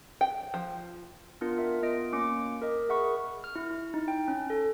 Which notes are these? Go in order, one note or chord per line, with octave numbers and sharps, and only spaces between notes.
G5
F3
B3 D4 F4 A#4 C#7
A#4 E5
B3 F4 D#5 A#6 D7
A#3 C#4 D6 C#7 D7
A#4 D#5
G#4 A#4 E5 F#5 B5 C#6
F6
E4
E4
D#4
G5
C#4
A4